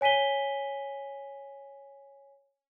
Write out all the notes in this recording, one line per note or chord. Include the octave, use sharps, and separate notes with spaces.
C#5 G#5 B6 D#7 G7